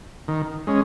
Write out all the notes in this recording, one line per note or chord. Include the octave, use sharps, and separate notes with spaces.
D#3
G#3 C#4